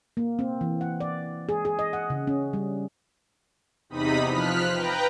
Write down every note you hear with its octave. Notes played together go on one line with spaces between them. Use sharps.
A#3
C4
E3
F#5
D5
G#4
G#4
D#5
F#5
C#3
C#4
G3
E2 C3 D#4 B5 D#6 B6
F3 F6 F#6 B6
B4 G5 A#5